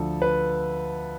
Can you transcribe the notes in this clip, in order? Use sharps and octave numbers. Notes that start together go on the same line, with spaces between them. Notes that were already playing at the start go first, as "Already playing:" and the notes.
Already playing: D2 D3 F3 A4
B4